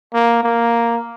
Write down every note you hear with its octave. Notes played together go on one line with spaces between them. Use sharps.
A#3
A#3